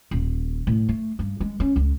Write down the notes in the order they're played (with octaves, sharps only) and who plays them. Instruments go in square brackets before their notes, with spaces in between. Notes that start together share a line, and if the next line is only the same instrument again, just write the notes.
[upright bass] D#1
A2
A3
G2
G#3
C#4
C#2